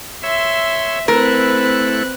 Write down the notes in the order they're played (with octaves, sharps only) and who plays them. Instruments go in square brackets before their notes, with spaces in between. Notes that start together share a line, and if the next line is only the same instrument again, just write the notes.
[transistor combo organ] C#5 E6 [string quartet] E5 [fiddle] C6
[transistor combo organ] A3 E4 [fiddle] C4 F#6 [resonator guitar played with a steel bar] A#4 [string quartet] B4